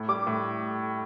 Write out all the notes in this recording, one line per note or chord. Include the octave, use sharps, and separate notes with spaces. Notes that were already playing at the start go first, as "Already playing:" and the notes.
Already playing: A2
G3 D6
A2